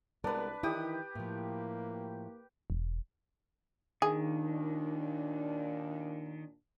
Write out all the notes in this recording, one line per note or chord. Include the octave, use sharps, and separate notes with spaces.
C2 G#3 B3 D4 A#4 B4
D#3 E3 E4 G4 D#6
A2 F3 A#3
E1
D#2 A#2 D#3 D4 G#4